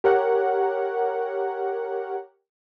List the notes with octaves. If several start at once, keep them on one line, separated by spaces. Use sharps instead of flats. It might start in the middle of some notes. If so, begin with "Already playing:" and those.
G4 A#4 C#5 F#5